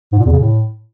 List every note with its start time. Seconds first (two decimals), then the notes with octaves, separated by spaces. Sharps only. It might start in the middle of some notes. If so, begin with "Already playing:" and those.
0.12 G#2
0.19 A#2
0.25 E2
0.32 C#3
0.39 A2